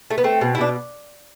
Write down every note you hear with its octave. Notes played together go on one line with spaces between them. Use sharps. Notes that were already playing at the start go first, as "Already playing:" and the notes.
A3
B3
A3 C4
B2
E4
B2 D4